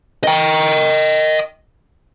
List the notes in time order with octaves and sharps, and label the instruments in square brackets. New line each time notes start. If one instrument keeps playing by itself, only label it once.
[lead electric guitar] D#5 G5